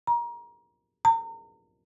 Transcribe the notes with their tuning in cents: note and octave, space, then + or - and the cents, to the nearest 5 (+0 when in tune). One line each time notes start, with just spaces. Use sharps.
A#5 +25
A#5 -35